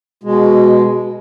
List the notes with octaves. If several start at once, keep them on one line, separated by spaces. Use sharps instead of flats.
B2 G#3